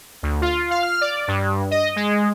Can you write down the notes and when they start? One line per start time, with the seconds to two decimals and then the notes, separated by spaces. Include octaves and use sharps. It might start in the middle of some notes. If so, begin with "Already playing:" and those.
0.23 D2
0.41 F4
0.71 F5
0.83 F6
1.01 D5
1.28 G2
1.71 D#5
1.96 G#3